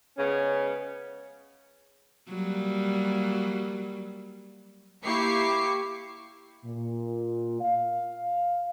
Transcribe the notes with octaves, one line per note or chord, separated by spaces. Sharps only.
C#3 G#3 B3 C#4
F#3 G3 A#3
A#3 E4 G4 C#6 D6 C7
A#2
F5